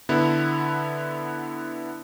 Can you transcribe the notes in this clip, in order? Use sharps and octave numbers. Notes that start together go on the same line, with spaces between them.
D3 B3 E4